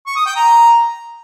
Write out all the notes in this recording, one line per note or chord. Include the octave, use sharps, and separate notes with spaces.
C#6
D#6
G5
A#5